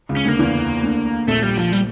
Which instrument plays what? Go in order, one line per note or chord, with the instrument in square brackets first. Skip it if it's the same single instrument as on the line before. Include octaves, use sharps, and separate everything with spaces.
[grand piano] C#2 C#3
[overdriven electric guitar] C#4
[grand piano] D2 D3 [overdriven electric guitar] A#3
[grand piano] E2 E3
D2 D3
[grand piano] A#1 A#2 [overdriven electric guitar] A3
[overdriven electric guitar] G3
F3
G3